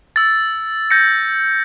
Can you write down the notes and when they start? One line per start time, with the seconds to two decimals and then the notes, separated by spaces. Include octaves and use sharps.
0.16 E6 A6
0.90 G6 A#6 C#7